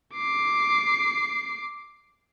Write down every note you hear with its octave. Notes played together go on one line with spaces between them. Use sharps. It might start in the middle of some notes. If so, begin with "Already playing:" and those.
D6 C7